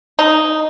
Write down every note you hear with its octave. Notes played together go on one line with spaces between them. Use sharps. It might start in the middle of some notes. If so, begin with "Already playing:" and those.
D#4